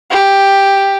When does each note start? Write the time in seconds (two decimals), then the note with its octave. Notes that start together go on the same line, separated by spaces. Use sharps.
0.11 G4